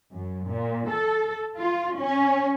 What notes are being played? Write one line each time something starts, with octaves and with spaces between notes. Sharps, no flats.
F#2
A#2
A4
F4
C#4